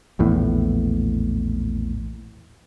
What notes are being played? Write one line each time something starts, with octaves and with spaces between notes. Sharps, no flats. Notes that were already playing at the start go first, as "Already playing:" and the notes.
A#1 E2 A2